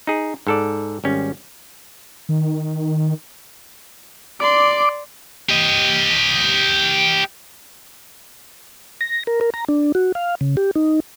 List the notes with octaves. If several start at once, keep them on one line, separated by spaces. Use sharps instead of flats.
D#4 G#4
G#2 A4 D5
G#1 G3 C#4
D#3
D5 C6 D6
G4 D#5
A#6
A#4
A#4
A#5
D4
F#4
F5
C#3
G4
D#4